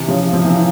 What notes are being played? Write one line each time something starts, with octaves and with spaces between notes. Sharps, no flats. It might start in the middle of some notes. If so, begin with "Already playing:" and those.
Already playing: C3 E3
C#3 F3
F3
E3